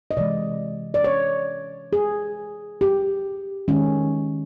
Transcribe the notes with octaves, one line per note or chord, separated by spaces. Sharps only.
D#5
C3 E3 G#3 D5
D5
C#5
G#4
G4
D#3 G#3 C#4